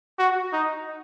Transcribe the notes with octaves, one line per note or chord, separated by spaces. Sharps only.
F#4
D#4